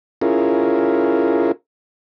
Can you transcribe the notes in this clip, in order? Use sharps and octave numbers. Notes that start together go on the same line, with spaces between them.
C#4 E4 F4 G#4 A#4